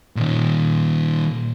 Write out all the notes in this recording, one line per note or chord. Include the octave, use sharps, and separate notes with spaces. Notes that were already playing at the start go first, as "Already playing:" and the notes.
A#2 D#3